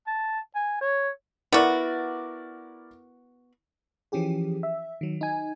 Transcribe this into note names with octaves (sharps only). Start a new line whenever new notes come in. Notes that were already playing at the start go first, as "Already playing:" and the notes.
A5
G#5
C#5
B3 E4 F#4 A#4 D5
E3 F3 C#4 G4 G#4
E5
D#3 F#3
D#4 G#5